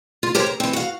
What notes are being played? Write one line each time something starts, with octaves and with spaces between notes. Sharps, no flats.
F4
G4 A#4 C5 C#5
A#5
E3 C4
F#4 F5